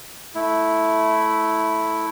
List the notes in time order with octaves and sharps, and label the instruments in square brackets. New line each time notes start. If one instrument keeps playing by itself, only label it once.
[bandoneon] A3 E4